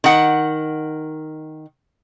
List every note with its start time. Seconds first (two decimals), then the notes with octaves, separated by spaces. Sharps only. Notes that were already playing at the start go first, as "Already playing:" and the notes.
0.04 D#3 F#5